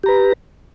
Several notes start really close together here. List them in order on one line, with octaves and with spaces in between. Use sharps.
G4 A#5 B4